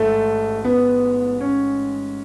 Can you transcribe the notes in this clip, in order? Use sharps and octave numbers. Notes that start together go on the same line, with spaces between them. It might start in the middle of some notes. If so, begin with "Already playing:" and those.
Already playing: A1 G#2 A3
B3
C#4